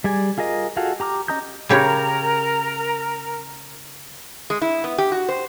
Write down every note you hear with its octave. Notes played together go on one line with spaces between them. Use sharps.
G3 G#4 D5 G#5
F4 G#4 A#4 D#5
F4 F#4 G#4 A4 F5
G4 A#5 D6 F6
C#4 D#5 A#5 D#6 G6
C#3 G4 A#4 C#5
G#3
E4
B3
G4
F#4
C5